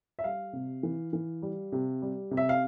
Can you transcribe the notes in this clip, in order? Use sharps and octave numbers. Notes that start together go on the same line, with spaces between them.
E5
G3 F5
C3
E3
E3
G3
C3
G3
C3
E5
F5